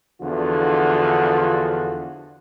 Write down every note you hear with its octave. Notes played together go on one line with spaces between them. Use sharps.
E2 D3 F3 F4 F#4